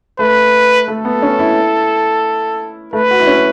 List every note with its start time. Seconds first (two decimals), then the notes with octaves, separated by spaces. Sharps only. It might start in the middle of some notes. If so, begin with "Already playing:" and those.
0.19 A3 B4
0.88 A3 A4
1.05 B3
1.22 C#4
1.39 E4
2.93 A3 B4
3.11 F#4
3.19 E4
3.27 C#4